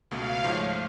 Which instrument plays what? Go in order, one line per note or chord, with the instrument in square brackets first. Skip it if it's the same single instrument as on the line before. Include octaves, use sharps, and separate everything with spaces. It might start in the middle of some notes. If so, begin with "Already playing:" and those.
[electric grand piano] C#2 B2 A3 [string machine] F5
[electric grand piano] G#2 F3 A3 [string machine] C#5